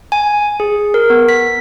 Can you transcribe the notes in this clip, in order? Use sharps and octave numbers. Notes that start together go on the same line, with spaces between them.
G#5
G#4
A#4
B3
B6